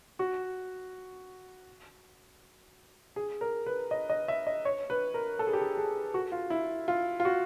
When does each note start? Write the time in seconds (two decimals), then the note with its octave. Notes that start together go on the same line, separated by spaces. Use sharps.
0.19 F#4
3.16 G#4
3.41 A#4
3.66 B4
3.91 D#5
4.10 D#5
4.28 E5
4.47 D#5
4.65 C#5
4.90 B4
5.14 A#4
5.39 A4
5.47 G#4
5.53 G4
5.61 G#4
5.77 G#4
6.14 F#4
6.32 F4
6.50 E4
6.88 F4
7.20 F4
7.25 F#4